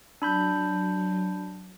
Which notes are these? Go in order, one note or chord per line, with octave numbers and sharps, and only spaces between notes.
F#3 D4 B5 G6